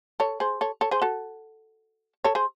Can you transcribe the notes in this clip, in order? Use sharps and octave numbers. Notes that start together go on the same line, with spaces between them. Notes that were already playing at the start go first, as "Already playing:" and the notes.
A4 C#5
G#4 C5
A4 C#5
A4 C#5
G#4 C5
F#4 A4
A4 C#5
G#4 C5